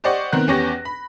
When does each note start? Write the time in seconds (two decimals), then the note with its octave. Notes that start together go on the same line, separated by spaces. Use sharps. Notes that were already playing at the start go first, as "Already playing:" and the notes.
0.04 G4 C5 D5 D#5 F#5 C#6
0.33 D#3 B3 C4 A#4 F#6
0.47 E2 B3 C#4 G4 C#6 A#6
0.85 B5